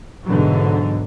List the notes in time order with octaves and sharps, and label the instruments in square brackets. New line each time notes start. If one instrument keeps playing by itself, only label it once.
[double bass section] G#2 B2 D3 E3 F#3